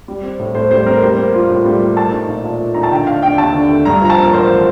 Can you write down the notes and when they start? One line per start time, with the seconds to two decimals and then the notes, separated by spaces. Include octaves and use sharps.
0.08 G3
0.23 C4
0.39 A2
0.55 A2 C5
0.71 G3 C5
0.86 C4 A#4
1.02 G3 C5
1.18 A#3
1.34 F4
1.50 A2
1.65 G3
1.81 A#3
1.97 A3 A5
2.12 D#4
2.28 A#2
2.44 A#2
2.59 A3
2.74 D#4 A#5
2.83 A5
2.91 D3 G5
3.07 A3 F5
3.22 D4 G5
3.38 D#2 A5
3.54 D3
3.70 A3
3.85 G2 A#5
4.01 F3 A#5
4.10 A5
4.18 A#3
4.23 A#4
4.33 A1 C5